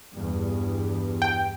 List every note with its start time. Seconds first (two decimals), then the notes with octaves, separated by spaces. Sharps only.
0.11 E2 G2
1.22 G5